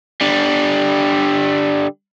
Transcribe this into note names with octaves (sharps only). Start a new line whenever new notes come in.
D3 G3